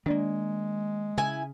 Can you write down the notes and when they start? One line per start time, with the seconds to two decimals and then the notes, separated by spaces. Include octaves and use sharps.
0.06 D#3 G#3 A#3 D4 D5
1.18 C#3 E4 G#5